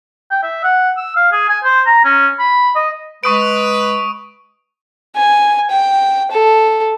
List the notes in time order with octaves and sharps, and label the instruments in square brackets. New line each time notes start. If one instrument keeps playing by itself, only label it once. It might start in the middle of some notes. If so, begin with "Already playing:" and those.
[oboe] G5
E5
F#5
E6
F5
G#4
G#5
C5
A#5
C#4
B5
D#5
[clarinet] G#3 [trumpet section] B4 [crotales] C#6 D#6 D7
[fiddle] G#5
G5
A4